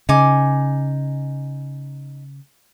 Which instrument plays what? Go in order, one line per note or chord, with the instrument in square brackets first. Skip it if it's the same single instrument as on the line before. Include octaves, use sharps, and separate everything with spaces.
[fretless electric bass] C#3 [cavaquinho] D#4 G#5 D6